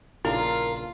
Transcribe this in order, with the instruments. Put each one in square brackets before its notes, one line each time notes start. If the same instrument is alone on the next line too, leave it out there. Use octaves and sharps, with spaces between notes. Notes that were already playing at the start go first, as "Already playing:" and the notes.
[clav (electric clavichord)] A#1 C#3 D4 [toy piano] E4 [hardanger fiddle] F4 [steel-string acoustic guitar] A#4